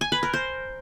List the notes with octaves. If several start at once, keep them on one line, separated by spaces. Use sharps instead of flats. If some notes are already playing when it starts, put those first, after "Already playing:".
G#5
B4
A#4
C5